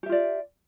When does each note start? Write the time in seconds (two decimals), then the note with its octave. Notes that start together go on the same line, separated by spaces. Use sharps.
0.03 G4
0.06 E5
0.09 F4
0.12 D5